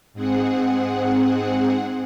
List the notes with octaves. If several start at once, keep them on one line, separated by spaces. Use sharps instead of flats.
G#2 C4 G#4 F#5